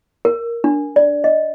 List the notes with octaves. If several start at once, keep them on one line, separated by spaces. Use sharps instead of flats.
A#4
D4
D5
D#5